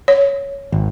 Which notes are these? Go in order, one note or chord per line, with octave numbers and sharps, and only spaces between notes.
C#5
G#1